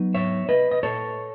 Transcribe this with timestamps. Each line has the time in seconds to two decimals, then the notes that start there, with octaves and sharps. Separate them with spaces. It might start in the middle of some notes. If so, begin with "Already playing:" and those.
Already playing: F#3 B3 D#4
0.14 C#5 E5
0.49 B4 D#5
0.71 D#5
0.83 A4 C#5